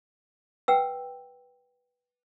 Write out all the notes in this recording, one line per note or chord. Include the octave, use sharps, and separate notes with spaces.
B4 F#5 G5 E6